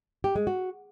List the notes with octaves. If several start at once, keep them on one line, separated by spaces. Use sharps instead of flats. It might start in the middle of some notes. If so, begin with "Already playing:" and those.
G4
G#3
F#4